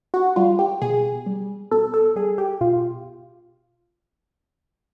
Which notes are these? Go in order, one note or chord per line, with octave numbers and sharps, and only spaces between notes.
F#4
G3 F4
G4
B2 G#4
G3
B2 A4
A4
G3 G#4
G4
B2 F4